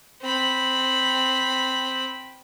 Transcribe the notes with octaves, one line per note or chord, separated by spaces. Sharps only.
C4 B5